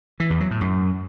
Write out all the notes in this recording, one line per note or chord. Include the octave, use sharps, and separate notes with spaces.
E3
E2
F#3
A2
F#2